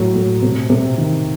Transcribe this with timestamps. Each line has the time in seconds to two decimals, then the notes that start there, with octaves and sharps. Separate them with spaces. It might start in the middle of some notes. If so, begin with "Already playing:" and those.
Already playing: A2 F#3
0.16 A2
0.42 C3
0.70 C3
0.98 D#3